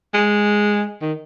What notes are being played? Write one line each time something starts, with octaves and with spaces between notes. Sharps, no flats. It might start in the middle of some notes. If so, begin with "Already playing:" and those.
G#3
D#3